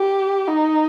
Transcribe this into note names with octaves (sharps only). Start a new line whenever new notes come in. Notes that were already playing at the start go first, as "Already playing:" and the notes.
Already playing: G4
D#4